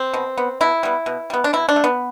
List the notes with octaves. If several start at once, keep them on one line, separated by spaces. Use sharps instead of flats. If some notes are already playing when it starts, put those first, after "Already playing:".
Already playing: C4
B2
B3
B2 E4
G3 B3
B2
G3 B3
D4
B2 E4
D4
A3
B3